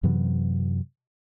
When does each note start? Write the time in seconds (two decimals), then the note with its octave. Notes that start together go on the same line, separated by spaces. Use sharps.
0.03 F#2 C3 E3 F#3